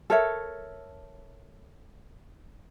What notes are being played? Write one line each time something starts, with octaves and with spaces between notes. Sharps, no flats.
A4 A#4 C#5 E5